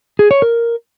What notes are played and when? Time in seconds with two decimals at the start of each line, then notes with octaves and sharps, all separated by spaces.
0.19 G#4
0.31 C#5
0.42 A#4